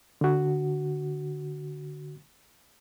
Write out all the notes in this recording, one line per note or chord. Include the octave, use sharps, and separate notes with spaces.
D3 F#4